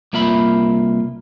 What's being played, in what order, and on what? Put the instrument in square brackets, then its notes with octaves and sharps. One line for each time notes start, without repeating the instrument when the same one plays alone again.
[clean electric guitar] C2 A#3 F4 E5 B5